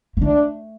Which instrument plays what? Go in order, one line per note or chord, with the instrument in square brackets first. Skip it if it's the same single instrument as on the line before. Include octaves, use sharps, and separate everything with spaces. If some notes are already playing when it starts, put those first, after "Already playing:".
[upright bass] A#3
[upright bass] A3 [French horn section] D4